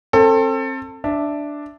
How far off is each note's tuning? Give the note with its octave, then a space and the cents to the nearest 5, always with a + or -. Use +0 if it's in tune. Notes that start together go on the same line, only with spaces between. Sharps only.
C4 +30 A4 +20
D4 +0 E5 +0